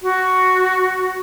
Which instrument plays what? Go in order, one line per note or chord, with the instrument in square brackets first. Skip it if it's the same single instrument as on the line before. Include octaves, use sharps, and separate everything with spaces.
[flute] F#4